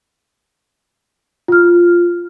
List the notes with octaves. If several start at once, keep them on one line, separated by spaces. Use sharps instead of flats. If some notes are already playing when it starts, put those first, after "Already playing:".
F4 F6